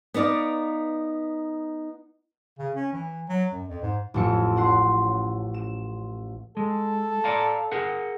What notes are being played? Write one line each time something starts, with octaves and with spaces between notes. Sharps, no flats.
B3 D#4 D5 F5
C#3
C#4
E3
F#3
F#2
F2
G#2
A1 F2 C#7
C#4 F#5 C6
E7
G#3 A4
D5 F5 A#5
G#4 A#4 F#5